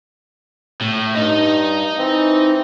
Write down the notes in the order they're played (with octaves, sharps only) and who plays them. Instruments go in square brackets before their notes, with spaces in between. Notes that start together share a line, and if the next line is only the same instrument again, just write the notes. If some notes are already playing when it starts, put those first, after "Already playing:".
[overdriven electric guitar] A2
[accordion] G2 [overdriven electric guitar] D#4 D#5
[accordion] E3 C4